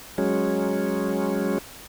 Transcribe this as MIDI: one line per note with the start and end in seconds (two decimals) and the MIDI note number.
0.18 1.58 54
0.18 1.58 56
0.18 1.58 61